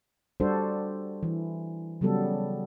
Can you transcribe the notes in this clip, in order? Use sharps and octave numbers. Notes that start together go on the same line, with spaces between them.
G3 D4 F#4 A4 C5
E3
C#3 F#3 G3 B3 A4